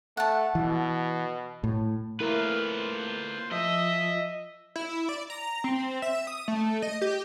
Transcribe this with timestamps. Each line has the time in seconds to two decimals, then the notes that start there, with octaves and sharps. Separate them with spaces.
0.17 A3 F#5 A5
0.55 B2 E3
1.64 A2
2.20 A3 A#3 C4 E4 F4 A#4 B4 F5
2.79 C5
3.51 F3 D#5 E5
4.76 E4
5.09 D5
5.30 A#5
5.64 C4
6.02 E5
6.27 D#6
6.48 A3
6.82 D#5
7.02 G4